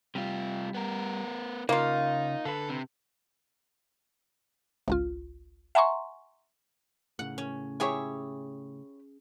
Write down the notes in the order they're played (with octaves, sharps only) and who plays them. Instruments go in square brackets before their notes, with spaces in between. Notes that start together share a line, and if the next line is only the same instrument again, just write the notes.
[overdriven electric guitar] C3 F4 [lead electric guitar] G3
[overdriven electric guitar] B3 A#4
[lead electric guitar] C#3 [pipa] A#3 F4 [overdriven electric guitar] D#4
[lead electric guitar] D3 B4 [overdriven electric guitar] A4
[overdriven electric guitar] C3
[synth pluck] G#1 C#2 F4
E5 F#5 G#5 A#5 C6 C#6
[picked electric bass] A2 C#3 [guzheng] F#5
[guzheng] C#4
[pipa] E4 G4 C#5 [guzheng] G#4 E5 G#5